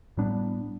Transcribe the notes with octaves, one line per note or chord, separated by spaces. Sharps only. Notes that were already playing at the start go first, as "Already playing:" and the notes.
A2 G3 B3 D4